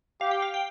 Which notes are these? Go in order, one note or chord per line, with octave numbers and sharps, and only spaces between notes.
G4 F5
G5
F5
G5